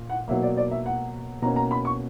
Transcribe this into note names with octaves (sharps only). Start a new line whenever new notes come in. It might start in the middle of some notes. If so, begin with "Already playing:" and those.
Already playing: A#2
F#5
B2 F#3 A#3 E5
D5
D5
E5
F#5
B2 A#3 C#4 A#5
A#5
B5
C#6